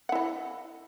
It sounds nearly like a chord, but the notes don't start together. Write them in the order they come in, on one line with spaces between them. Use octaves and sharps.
F#5 E4 D#5